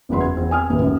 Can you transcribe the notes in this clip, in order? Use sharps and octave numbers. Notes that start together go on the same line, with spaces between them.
F#1 E2 F#3 B4 B5 C6
G#6
E2 C4
G#5 D#6 F6
F#1 D#2 A2 B4
F#2